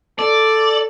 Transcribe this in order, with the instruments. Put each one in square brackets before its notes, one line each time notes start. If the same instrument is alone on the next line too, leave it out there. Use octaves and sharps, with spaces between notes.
[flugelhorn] A4 [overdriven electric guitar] D5